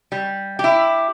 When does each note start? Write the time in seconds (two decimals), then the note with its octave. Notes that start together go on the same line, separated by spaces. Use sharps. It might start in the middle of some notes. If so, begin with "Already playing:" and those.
0.12 G3
0.59 E4 G4